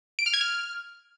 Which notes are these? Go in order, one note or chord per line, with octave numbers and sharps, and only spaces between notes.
D7
F6
G#6
F6